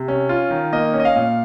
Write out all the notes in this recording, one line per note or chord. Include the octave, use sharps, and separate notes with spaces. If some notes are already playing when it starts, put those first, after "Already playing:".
Already playing: C3
C#4
F4
D#3
A#3 D#5
C#4
D#5
F5
A#2